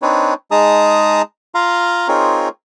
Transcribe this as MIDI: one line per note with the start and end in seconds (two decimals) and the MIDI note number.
0.02 0.34 60
0.02 0.34 62
0.02 0.34 63
0.02 0.34 71
0.02 0.34 73
0.51 1.22 56
0.51 1.22 63
0.51 1.22 68
0.51 1.22 81
0.51 1.22 82
0.51 1.22 87
1.55 2.08 65
1.55 2.08 77
1.55 2.08 82
1.55 2.08 84
2.08 2.49 60
2.08 2.49 63
2.08 2.49 65
2.08 2.49 68
2.08 2.49 70
2.08 2.49 73